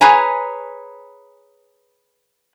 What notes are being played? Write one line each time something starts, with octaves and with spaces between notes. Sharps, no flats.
G#4 B4 C#5 G#5 A#5